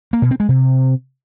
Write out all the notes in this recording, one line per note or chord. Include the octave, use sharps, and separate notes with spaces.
A#3
B2
C4
G#3
C3